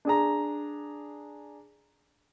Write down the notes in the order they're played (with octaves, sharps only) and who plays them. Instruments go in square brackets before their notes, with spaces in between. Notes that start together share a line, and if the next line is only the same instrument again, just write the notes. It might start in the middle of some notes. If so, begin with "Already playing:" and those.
[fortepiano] D4 G#4 A#5